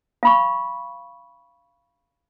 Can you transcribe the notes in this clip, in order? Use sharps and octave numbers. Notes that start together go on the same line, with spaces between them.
F5 B5 C#6